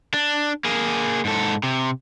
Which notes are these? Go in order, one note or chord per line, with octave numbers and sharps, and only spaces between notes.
D4
A#3 G#4
G#2 A4
C3